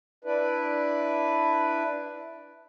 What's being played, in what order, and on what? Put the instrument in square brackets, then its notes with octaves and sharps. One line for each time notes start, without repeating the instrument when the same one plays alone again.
[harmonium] D4 E4 B4